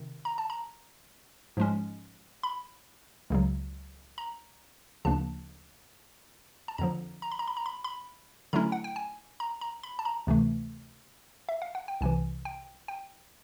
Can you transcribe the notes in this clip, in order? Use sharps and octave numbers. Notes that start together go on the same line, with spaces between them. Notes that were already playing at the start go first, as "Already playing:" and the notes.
Already playing: C3 D#3
A#5
A5
A#5
G#2 F3 G#3 C#4
B5
C#2 C#3 F#3
A#5
D2 C#3 F3 A#3 D4 A5
A5
F2 D3 F3 A#5
A#5
B5
A#5
B5
A#5
B5
B5
D3 F#3 A3 C#4 E4 A#5
F#5
G5
G#5
A#5
A#5
B5
A5
A#5
D2 C3 E3 A3
E5
F5
F#5
G5
C2 C3 E3 G#5
G5
G5